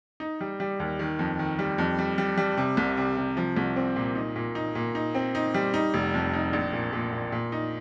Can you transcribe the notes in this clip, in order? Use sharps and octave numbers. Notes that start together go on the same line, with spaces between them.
D#4
G3
G3
D#2
D#3
F2
D#3
G3
F2
G3
G3
G3
C3
C2
C3
C3
F3
C2
C4
A#2
D#4
A#2
D#4
A#2
D#4
C4
D#4
G3
D#4
F1
F2
D#4
A#1
A#2
A#2
A#2
A#2
D#4